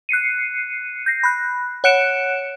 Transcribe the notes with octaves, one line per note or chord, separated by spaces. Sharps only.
F#6 C7 C#7 D#7
G6 A#6 C7
B5 F#6
C#5 F#5 F#6 C#7 D7 E7